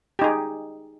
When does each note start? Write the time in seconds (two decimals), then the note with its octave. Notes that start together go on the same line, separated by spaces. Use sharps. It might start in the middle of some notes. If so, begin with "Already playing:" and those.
0.19 G4
0.22 D#4
0.24 G#4